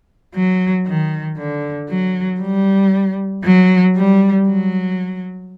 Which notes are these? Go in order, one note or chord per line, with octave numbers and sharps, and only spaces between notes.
F#3
D#3
D3
F#3
G3
F#3
G3
F#3